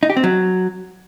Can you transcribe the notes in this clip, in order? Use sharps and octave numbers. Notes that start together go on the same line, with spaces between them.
D#4
G4
C4
F#3